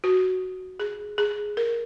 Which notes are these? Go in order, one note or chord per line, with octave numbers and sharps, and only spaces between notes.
F#4
G#4
G#4
A#4